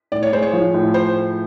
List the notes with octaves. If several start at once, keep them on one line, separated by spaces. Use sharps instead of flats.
A2 D5
C#5
G#3 C5
C#5
F3
A2
C5